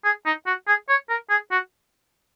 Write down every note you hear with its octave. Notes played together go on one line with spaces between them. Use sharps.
G#4
D#4
F#4
G#4
C#5
A#4
G#4
F#4